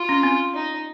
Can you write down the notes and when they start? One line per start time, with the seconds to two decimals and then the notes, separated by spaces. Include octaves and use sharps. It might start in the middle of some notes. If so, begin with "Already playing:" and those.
Already playing: F4
0.09 C#4
0.23 C4
0.55 D#4